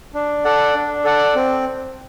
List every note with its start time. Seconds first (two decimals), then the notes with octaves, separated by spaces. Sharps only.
0.14 D4
0.45 A4 D5 F#5
0.75 D4
1.04 A4 D5 F#5
1.35 C4